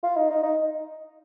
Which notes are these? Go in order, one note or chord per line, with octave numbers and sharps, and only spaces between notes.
F4
D#4
D#4
D#4